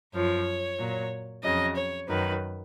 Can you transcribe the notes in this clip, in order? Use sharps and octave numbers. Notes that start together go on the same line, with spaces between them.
F#2 F3 C#5
A#2 F#3
F2 C#3 F#3 D#5
C#5
F#2 D#3 F#3 B4